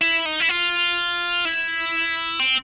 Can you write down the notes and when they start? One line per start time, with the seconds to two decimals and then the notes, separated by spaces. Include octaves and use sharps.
0.01 E4
0.26 D#4
0.40 E4
0.49 F4
1.45 E4
2.39 C4